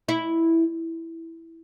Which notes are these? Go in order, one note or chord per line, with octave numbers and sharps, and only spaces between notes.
E4